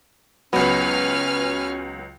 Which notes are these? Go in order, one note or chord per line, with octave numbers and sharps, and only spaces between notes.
C#2 F#3 B3 C#4 B4 F6